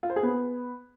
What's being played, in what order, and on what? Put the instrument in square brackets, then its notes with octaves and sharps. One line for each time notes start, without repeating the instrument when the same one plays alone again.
[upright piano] F4
C5
G#4
B3